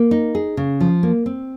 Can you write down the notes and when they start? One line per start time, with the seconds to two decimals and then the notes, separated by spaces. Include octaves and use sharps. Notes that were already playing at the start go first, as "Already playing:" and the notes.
Already playing: A#3
0.11 D#4
0.35 G#4
0.57 C#3
0.80 F3
1.03 A#3
1.26 C4